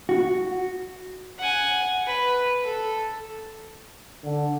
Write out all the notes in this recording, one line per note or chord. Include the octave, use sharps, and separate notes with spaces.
F#4
F#5 G#5
B4
A4
D3